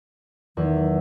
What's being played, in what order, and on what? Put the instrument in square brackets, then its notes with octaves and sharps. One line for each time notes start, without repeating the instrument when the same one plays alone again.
[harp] E2 F#3 [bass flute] D#3